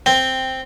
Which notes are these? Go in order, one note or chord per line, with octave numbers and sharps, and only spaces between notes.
C4